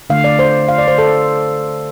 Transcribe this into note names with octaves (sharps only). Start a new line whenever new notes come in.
D3 A3 F5
D5
C5
F5
D5
C5
A4